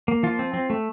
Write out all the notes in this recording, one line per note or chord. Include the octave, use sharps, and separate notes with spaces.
A#3
F3 F4
C4
C4
A3